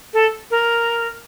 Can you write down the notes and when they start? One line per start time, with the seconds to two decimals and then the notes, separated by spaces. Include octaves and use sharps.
0.14 A4
0.51 A#4